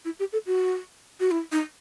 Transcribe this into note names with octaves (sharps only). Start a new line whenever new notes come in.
E4
G4
A4
F#4
F#4
E4
D#4